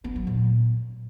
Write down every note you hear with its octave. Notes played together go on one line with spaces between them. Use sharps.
B3
F#3
A#2